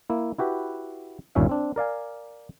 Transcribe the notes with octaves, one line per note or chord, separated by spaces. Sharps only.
A#3 E4
E4 F#4 G4 B4
G1 D#2 A#2 C#4 E5 F5
C4 D4
A#4 D5 F5 G#5